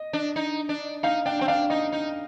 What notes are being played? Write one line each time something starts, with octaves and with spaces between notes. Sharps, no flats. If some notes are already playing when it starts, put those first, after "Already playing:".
Already playing: D#5
D4
D#4
D4
D#4 F5
D4 G5
C4 G5
D4 F5
D#4 D#5
D#4